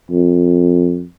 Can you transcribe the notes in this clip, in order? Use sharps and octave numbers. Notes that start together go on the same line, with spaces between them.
F2